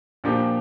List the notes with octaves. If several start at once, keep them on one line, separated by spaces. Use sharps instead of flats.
A#2 F3 A#3 D4 G4